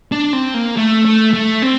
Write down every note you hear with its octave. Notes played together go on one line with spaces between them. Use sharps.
D4
C4
A#3
A3
A3
A3
C4